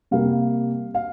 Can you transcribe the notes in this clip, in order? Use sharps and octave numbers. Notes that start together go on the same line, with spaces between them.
C3 G3 A#3 F5
F5